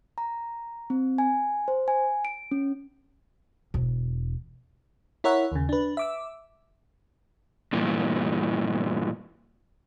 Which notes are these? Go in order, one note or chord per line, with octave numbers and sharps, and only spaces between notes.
A#5
C4
G#5
C5
G#5
D7
C#4
E1
E4 A#4 C#5 E5 F#5
D#2 C#3
D4 B4
E5 D6 E6
G2 A#2 E3